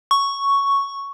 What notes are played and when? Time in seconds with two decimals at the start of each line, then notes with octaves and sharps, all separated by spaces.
0.11 C#6